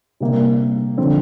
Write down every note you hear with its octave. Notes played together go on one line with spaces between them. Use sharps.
C3 G3 A#3
D3 F3 C4